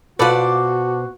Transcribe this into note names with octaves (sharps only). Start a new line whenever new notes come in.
B2 F4 F#4 A4 B4 C5 D5 D6